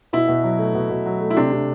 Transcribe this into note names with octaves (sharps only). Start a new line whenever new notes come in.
B2 E4
B2
F#3
A3
B2
B2
F#3
A3
E4
C3 D4
C3